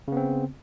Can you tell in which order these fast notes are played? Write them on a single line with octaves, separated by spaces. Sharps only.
C#3 B3 C4